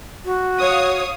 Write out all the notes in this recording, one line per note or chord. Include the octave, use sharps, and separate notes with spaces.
F#4
C#5 F5 D#6